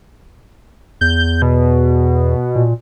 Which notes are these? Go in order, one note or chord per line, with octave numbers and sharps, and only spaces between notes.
E2 G6
B2
A#2